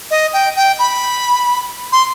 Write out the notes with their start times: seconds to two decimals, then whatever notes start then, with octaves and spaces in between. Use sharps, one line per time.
0.11 D#5
0.33 G5
0.56 G5
0.79 B5
1.92 C6